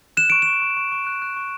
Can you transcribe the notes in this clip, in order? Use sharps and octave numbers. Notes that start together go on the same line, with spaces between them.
F#6 E7
C#6 D7
E7
C#6
C#6
C#6
C#6
F#6
F#6
C#6